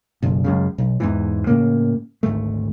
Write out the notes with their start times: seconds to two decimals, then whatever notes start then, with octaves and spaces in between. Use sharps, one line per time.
0.22 F#1 B1
0.44 C#2 F#2 C#3
0.78 B1
1.00 E2 G#2 E3
1.47 A2 C#3 A#3
2.23 G#1 D2 A3